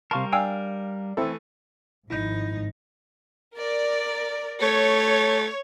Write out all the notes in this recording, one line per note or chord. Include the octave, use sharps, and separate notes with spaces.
C3 G3 A#4 F5 A5 C6 C#6
D4 F5 G5 G#5 E6
E3 A3 C4 E4 A4
G#1 G#2 F3 D#4 E4 G6
A#4 D5
A3 C#5